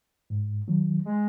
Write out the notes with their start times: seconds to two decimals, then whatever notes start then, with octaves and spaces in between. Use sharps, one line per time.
0.30 G#2
0.68 D#3 F#3
1.06 G#3